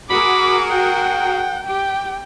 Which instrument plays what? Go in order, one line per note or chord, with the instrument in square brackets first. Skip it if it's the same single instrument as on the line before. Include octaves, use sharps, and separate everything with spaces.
[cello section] F#4 G#4 A#4 [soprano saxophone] B5 [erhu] D6
[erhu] F#5 [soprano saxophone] G5
[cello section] G4 [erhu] G5